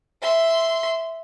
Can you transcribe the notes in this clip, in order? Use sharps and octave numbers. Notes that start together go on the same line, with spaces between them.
E5 C6